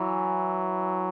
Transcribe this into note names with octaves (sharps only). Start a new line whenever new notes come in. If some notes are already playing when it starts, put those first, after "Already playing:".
Already playing: E3 F#3